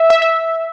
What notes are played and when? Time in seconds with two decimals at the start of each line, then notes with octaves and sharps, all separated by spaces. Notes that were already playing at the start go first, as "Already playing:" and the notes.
Already playing: E5
0.10 E5
0.22 E5